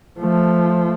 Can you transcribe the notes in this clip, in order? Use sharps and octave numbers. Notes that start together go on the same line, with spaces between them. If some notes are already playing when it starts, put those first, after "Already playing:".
F3 A3